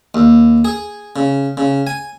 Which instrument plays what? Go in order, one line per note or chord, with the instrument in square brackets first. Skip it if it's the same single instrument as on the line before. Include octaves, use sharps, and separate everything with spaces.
[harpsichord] D#2
G#4
C#3
C#3
G#5